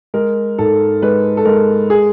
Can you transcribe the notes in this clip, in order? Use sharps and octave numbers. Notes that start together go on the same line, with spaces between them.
G#3 A#4
G#2 A4
G#3 B4
A4
G#3 A#4
G#4